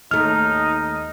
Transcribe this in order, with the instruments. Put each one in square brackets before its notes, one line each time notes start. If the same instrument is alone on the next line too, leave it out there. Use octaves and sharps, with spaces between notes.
[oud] D#2 A3 [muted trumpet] D#4 [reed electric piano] F6